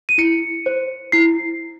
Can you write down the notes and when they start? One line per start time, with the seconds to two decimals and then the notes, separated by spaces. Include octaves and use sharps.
0.09 D#7
0.18 E4 C#7
0.66 C5
1.12 E4 C7